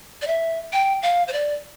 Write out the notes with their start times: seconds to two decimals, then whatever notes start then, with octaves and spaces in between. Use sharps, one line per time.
0.22 D5
0.27 E5
0.73 G5
1.02 F5
1.28 C5
1.33 D5